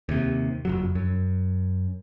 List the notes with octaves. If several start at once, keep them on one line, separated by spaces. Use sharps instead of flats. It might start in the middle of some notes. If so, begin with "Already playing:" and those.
D#2 C3
F#1 F2 F#3
F#2